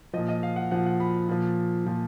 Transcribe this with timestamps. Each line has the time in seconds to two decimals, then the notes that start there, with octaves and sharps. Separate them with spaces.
0.13 A#2 F3 D#5
0.29 D#5
0.43 F5
0.56 F#5
0.71 A#2 F3 F#5
0.86 F#5
1.00 B5
1.28 A#2 F3
1.86 A#2 F3